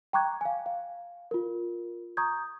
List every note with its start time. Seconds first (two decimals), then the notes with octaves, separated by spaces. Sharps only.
0.13 G5 A#5 C#6 D6 F#6 G#6
0.41 F5 G#5
0.66 F5
1.31 F4 A#4
2.17 A#5 C#6 D#6 G6 G#6